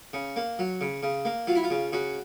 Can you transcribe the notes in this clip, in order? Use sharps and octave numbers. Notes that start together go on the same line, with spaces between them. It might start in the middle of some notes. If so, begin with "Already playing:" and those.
C#3
A#3
F#3
C#3
C#3
A#3
F#3 F4
E4
F4
C#3
C#3 F#4